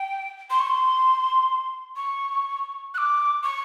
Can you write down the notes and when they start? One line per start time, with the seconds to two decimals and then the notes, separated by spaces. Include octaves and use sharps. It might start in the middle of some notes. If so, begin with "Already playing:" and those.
Already playing: G5
0.50 C6
0.60 C#6
0.67 C6
1.96 C#6
2.94 F#6
2.98 D6
3.44 C#6